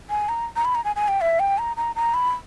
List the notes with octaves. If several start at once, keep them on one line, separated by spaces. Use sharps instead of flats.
G#5
A#5
A#5
B5
A#5
G#5
G#5
G5
E5
G5
A#5
A#5
A#5
B5